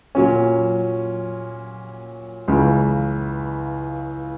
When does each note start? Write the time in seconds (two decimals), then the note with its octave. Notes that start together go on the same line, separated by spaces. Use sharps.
0.15 A#2 F#3 C#4
2.48 C#2 C#3 E3